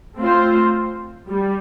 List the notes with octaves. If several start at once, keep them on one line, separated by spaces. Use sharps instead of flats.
A3 C4 F4 C5
G3